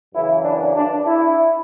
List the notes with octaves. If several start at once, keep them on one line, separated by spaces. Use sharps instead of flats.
F#2 C#3 E3 E4
D4
D4
E4